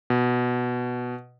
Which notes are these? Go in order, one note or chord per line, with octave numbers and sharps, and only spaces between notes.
B2